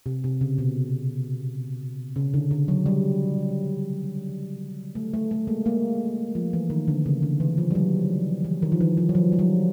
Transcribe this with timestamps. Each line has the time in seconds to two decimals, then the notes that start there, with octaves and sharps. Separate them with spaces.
0.06 C3
0.24 C3
0.41 C#3
0.58 B2
2.16 C#3
2.34 D3
2.51 D3
2.68 F#3
2.86 G3
4.95 A3
5.13 A3
5.31 A3
5.47 G#3 A#3
5.65 G#3 A#3
6.35 F3
6.53 E3
6.70 D#3
6.88 D3
7.06 C#3
7.23 D3
7.40 E3
7.58 F3
7.71 G3
7.75 F#3
8.45 E3
8.62 D#3
8.72 F3
8.81 E3
8.97 F3
9.09 F#3
9.15 F3
9.32 G3
9.39 F#3